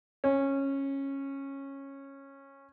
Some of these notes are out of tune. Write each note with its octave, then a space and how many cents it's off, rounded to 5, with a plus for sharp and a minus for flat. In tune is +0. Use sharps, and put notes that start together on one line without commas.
C#4 -15